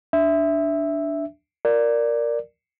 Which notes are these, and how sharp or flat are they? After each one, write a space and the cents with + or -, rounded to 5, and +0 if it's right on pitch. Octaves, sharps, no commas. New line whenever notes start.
D4 +0 E5 +0
A#4 +0 D5 +0